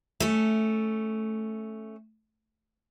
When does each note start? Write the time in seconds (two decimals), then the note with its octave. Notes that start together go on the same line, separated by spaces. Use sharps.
0.20 A3 C#4